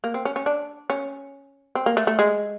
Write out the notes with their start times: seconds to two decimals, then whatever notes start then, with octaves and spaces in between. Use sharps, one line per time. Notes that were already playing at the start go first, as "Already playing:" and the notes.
0.04 A#3
0.14 C4
0.25 C#4
0.36 C#4
0.46 D4
0.90 C#4
1.75 C4
1.86 A#3
1.97 A3
2.07 A3
2.19 G#3